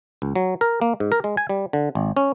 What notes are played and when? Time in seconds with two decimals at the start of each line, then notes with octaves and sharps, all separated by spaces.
0.22 C#2
0.36 F#3
0.61 A#4
0.82 A#3
1.00 G#2
1.12 A#4
1.24 G#3
1.37 G#5
1.50 G3
1.73 D3
1.95 G#1
2.17 C#4